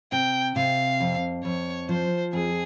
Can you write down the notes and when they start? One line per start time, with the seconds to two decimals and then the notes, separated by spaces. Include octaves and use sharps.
0.12 C3 G5
0.56 C3 F5
1.00 F2
1.44 F2 C#5
1.89 F3 C5
2.33 F2 G#4